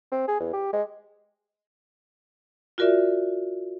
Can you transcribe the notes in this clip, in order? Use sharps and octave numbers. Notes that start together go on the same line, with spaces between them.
C4
G#4
E2
G4
G#3
F4 F#4 A#4 D5 E5